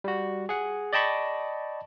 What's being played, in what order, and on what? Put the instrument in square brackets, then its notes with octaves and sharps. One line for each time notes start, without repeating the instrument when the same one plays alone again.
[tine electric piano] G3 F#4
G#4 F#5
D5 D#5 G5 A5 B5 C#6